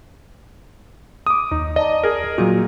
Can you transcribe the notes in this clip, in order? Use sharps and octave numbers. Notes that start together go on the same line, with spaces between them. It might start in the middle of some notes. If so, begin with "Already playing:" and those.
D6 D#6
D#2 D#4
D5 D#5 A5 A#5
G#4 A#4
A#2 F#3 A#3 F#4